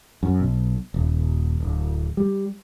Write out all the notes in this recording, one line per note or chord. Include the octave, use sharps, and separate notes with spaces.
F#2
B1
D#1
D1
G3